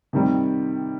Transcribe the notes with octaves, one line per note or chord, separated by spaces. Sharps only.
C3 D#3 G3